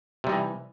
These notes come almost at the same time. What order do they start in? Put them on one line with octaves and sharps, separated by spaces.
C3 G3 D#4 E3